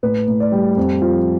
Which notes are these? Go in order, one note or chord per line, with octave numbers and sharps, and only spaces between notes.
A2 B4
A2
D5
G3
F2
F3